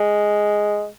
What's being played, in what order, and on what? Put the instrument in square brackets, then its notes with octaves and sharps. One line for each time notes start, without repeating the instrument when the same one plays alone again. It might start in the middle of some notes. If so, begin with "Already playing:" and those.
Already playing: [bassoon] G#3